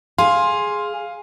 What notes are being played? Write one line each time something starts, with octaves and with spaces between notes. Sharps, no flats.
G#4 F5 C6